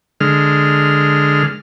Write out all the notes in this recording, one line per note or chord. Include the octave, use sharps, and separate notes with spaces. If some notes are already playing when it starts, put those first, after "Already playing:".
D3 G#3 F6